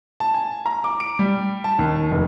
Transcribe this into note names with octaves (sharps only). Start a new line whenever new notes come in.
A5
G#5
A#5
D6
D7
G3
A5
D#2
F1